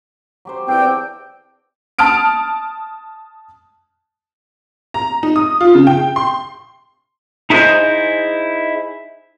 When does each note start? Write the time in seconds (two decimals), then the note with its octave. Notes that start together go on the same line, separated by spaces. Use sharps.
0.45 F#3 G4 C5
0.68 E2 C4 D4 G5
1.99 A5 D#6 F6 D7
4.94 A#5
5.23 D#4
5.36 D#6
5.61 F4
5.75 C#3
5.87 G5
6.16 C6
7.50 D#4 E4 G#4 B4 C5 D#5